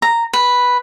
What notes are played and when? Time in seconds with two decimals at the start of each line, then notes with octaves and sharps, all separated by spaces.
0.02 A#5
0.33 B4